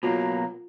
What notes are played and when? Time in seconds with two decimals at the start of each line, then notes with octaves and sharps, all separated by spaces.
0.03 B2 F#3 A#3 F4